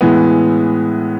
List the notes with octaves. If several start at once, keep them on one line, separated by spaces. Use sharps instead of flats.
A2 E3 G#3 B3